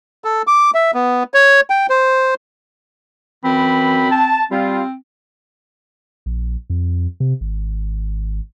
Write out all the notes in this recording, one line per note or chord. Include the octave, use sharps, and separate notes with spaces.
A4
D6
E5
B3
C#5
G5
C5
F#2 E3 C4 B5
A5
G3 C4 F4
A#1
F2
C3
G#1